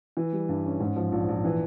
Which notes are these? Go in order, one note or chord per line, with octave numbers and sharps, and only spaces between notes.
E3
G3
G2
C#4
G#2
F3
A#1
A#1
E3